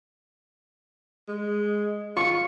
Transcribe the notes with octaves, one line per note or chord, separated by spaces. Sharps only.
G#3
F4 C#6 C#7